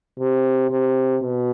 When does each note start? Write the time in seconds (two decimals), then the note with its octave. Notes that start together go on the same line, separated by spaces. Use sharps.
0.19 C3
0.70 C3
1.22 B2